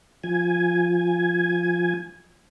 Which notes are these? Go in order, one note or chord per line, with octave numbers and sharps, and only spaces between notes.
F3 G#5